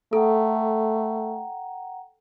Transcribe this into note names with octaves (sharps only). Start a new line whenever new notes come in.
A3 A4 F#5 G5 A#5